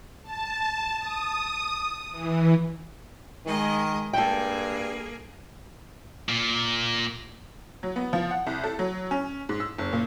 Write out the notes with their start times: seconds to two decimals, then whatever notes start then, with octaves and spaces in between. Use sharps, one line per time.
0.23 A5
0.99 D#6
2.12 E3
3.46 D#3 G#3 G#4 D#5
4.13 G2 A#3 G#4 A4 G5
6.29 A#2
7.83 F#3
7.96 B3
8.13 F3
8.31 F#5
8.47 C2
8.64 A4
8.79 F#3
9.11 C#4
9.49 G#2
9.60 E6
9.78 F#1
9.93 A#2